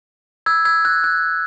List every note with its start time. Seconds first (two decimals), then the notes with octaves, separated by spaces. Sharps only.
0.46 E6 G#6
0.65 E6 G#6
0.85 F#6
1.04 F#6